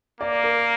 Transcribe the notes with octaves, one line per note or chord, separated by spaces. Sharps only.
A#3 D5
A#4